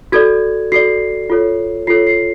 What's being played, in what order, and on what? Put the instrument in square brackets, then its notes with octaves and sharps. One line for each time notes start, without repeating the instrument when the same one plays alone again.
[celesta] F#4 A4 D5 G#6
F#4 A4 D5 C7
F4 A4 C#5
F4 A4 C#5 C7
C7